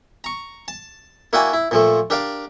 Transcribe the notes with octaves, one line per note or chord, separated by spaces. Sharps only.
A#5 C#6
A5
A#3 E4 F#4 D5 G5 G#5
E4
A#2 F3 A3
D4 G4 A#4 D5 F5